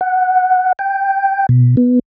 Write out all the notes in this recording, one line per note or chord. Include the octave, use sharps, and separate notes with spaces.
F#5
G5
B2
B3